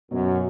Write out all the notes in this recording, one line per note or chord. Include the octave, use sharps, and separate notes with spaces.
F#2 B2 F#3